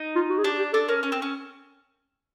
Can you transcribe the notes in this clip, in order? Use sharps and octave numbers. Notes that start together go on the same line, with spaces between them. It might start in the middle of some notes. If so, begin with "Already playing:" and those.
Already playing: D#4
F4
F#4
G#4
D4 G4
G4
D4 A4
C#4 A#4
C#4
C4
C#4